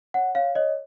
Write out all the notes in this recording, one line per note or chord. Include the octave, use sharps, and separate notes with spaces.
C#5 F#5
C#5 F5
C#5 D#5